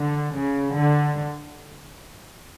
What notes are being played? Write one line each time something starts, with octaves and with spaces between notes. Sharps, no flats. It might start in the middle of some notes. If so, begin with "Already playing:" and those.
Already playing: D3
C#3
D3